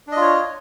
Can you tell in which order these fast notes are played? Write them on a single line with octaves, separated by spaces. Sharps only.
D4 D#5 F4 C#5